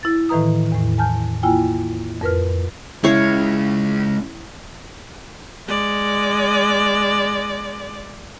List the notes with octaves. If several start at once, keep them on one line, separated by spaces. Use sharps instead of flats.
E4 A6
A2 D#3 E3 B4 A#5 D#6
E2 A2
G#5 A5 F6 G6
A#3 E4 F4 G5 G#5
F2 A#4 B4 F6
C#3 G#3 E4 C#5 F5
G#3 D5